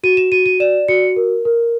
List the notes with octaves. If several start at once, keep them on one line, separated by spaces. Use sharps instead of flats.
F#4 D#7
E7
F#4 D#7
D#7
D5 E7
F#4 C#7
A#4
A#4